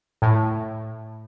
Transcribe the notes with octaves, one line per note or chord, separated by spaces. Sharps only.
A2